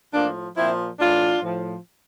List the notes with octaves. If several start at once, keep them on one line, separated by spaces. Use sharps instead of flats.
A2 F3 A#3 D4
A#2 F3 C4 E4
A2 E3 D4 F4
A2 F3